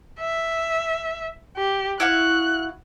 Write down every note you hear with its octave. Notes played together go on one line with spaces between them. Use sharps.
E5
G4
E4 F#4 F5 F#6